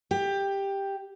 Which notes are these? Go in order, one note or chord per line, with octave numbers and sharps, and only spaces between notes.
G4